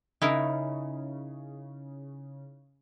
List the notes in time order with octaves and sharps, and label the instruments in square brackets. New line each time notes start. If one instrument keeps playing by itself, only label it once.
[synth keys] C#3 [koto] D#4 E4 A#4